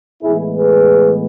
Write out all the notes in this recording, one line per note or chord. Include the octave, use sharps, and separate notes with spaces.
A2 E3 G#3 B3 E4 G#4
G#4 B4